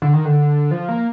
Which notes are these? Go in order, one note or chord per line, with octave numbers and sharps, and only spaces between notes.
D3
D#3
D3
F3
A#3